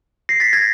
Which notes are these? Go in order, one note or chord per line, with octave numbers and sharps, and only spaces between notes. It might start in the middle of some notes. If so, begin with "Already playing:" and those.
A#6 C7
A6 B6
G#6 A#6